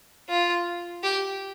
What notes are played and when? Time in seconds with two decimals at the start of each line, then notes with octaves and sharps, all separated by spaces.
0.29 F4
1.03 G4